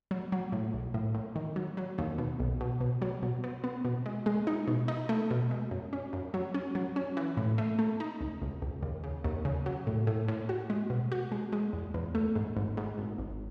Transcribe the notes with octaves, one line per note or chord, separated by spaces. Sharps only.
F#3
F#3
A2
B1
A2
A2
D#3
F#3
F#3
D#2
B2
B1
B2
B2
F#3
B2
B3
B3
B2
G#3
G#3
D#4
B2
D#4
A3
B2
G#3
F#2
C#4
F#2
F#3
C#4
F#3
C#4
E3
A2
A3
A3
D#4
C#2
C#2
C#2
D#2
C#3
D#2
C#3
F#3
A2
A2
A2
F#4
G#3
B2
F#4
G#3
G#3
E2
E2
A3
G#2
G#1
G#2
G#1
G#1